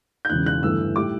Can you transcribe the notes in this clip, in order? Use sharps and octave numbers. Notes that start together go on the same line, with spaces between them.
G6
E1 E2 C#3 F#6
F#6
G1 G2 E3 A3 E6
A2 G3 D6